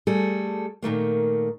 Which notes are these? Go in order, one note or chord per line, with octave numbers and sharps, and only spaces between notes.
G3 A3 G#4 A4
A#2 D#3 A3 A#3